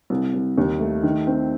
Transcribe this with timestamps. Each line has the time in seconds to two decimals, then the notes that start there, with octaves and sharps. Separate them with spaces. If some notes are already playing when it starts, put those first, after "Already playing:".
0.10 C2
0.34 C2
0.58 D#2
0.80 A3
1.03 D#3
1.27 C4